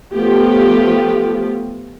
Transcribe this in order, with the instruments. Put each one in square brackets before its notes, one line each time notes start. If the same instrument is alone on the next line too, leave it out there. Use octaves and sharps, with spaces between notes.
[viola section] F3 A3 B3 G4